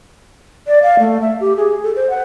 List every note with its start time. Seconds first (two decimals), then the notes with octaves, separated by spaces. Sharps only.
0.67 D5
0.83 F5
0.99 A3
1.22 E5
1.40 G4
1.57 G#4
1.83 A4
1.96 C5
2.10 F#5